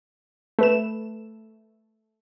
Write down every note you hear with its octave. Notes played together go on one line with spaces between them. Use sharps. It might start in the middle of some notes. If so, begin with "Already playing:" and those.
A3 B4 E7